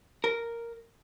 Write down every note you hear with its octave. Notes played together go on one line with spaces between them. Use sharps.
A#4